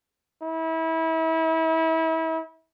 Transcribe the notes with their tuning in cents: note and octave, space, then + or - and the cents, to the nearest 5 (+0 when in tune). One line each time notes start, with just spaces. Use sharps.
E4 -30